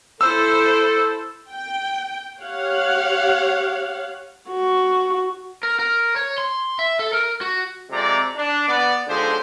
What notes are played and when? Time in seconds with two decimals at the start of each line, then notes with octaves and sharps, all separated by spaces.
0.21 E4 A4 C5 E6
1.51 G5
2.41 G4 C#5 F5 F#5
4.49 F#4
5.63 A#4
5.79 A#4
6.16 C#5
6.38 C6
6.79 E5
6.99 A4
7.13 A#4
7.41 F#4
7.91 F2 C3 G#3 D5 A#5
8.37 D4
8.68 B3 D5
9.08 B1 D3 F3 G#3 G4 C5